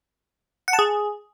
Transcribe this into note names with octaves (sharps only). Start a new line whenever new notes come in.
F#5
A5
G#4